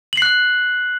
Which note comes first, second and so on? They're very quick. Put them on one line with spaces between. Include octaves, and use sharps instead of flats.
F#7 C7 F#6